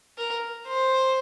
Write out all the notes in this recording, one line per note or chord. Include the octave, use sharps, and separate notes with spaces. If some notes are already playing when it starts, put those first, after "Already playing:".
A#4
C5